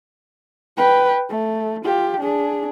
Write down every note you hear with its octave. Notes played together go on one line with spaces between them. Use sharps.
B4 G5
A3
F4 G4
D4 G#4